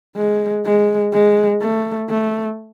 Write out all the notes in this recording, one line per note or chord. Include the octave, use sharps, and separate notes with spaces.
G#3
G#3
G#3
A3
A3